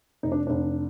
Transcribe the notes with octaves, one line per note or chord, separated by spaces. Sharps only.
F1 D#4
D4
F1 D4